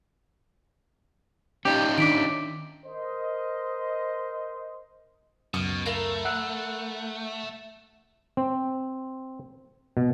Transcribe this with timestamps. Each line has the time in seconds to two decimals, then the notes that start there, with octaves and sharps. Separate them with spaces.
1.65 C#4 D#4 F4 G4
1.98 D#3 D4 D6 B6 D7
2.86 A#4 C5 D#5
5.54 C#2 F#2 B2 C#6 D#6 F6
5.86 A3 E4 A#4 F5
6.25 F#5 E6 F#6
8.37 C4
9.97 B2